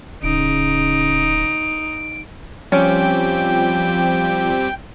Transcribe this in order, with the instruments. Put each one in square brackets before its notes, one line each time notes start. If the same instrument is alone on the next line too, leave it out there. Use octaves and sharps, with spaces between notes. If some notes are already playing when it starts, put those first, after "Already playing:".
[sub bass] D1 [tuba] C#3 [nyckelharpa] D#4 [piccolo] D7
[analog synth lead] F3 [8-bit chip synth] G3 C4 G4 [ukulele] C#4 [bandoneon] G5